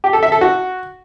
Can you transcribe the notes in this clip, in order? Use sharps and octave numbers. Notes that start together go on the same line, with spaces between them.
G4
A4
E5
A4
F#4